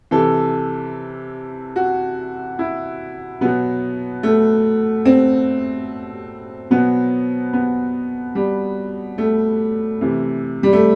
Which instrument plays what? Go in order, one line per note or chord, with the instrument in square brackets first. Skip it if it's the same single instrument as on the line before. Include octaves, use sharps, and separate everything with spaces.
[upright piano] C3 E3 A4
F#4
E4
B2 F#3 B3
A3
C4
B2 F#3 B3
B3
G3
A3
C3 E3
G3
A3